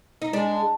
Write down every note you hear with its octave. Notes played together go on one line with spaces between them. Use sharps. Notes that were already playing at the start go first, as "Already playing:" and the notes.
D#4
G#3 D4